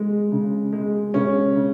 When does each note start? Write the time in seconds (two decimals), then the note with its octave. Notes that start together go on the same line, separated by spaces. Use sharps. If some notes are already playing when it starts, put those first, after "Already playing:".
Already playing: G#3
0.32 C#3
0.73 G#3
1.14 C#3 C#4
1.56 C#3